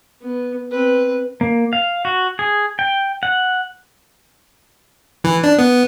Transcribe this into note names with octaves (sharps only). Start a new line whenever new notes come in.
B3
C4 B4
A#3
F5
F#4
G#4
G5
F#5
E3
D4
B3